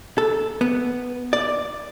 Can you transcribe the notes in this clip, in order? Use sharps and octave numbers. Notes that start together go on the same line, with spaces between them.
A4
B3
D5